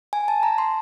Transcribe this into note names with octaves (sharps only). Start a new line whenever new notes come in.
G#5
A5
A#5
C6